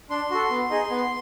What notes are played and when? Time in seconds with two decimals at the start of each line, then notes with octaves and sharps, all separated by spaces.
0.10 D4 C6
0.31 F#4 A4
0.50 B3
0.70 D#4 G#4
0.90 B3